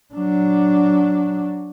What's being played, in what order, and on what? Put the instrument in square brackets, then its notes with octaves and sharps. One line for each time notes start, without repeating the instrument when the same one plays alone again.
[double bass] F#3 D4